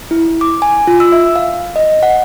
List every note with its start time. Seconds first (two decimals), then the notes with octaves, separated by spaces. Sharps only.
0.11 E4
0.41 D6
0.62 G#5
0.87 F4
1.00 E6
1.12 E5
1.36 F5
1.76 D#5
2.03 F#5